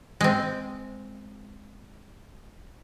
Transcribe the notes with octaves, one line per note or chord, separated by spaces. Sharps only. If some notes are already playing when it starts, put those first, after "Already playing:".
G#3 C4